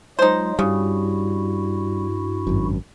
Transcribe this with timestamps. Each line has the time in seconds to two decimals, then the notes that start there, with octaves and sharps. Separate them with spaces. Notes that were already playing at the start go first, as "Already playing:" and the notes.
0.19 F#3 G#3 D#4 F4 C5
0.59 G2 C#3 G3 E4 F#4
2.47 G#1 F#2